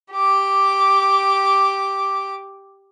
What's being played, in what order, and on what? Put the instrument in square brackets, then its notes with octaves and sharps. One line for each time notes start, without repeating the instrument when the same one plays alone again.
[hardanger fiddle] G4 D6